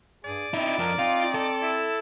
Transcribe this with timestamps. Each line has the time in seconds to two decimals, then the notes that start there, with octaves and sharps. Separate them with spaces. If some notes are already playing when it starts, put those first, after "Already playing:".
0.24 G2 G#4 D5
0.54 B3 C4 D#4 E4
0.79 F2 A#4
0.99 C4 D#4 F4
1.35 A4
1.62 E4